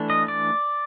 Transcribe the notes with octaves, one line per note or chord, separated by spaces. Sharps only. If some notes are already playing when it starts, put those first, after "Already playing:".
Already playing: E3 A3 D4
D#5
D5